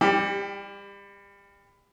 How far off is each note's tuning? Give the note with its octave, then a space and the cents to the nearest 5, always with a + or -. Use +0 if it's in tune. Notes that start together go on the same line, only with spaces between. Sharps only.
G3 +30 G4 +0